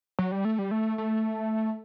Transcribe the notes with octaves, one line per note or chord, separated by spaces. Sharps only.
F#3
G3
A3
G3
A3
A3